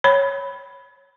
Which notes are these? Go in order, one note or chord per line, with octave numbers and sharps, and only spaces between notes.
C#5 B5